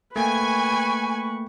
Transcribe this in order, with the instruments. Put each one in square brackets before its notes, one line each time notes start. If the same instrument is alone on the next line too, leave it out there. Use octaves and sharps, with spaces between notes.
[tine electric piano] A3 A#3 G5 [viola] B4 C#6 [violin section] G#5